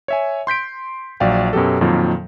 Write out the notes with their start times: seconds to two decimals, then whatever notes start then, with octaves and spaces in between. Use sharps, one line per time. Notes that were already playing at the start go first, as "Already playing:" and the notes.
0.08 C#5 E5 G#5
0.47 C6 G6 B6 D7
1.20 A#1 F#3 D5 F5 G5
1.53 F#2 B2 F#3 G4 A4
1.81 F2 A#2 D#3 F3 F#3 A#3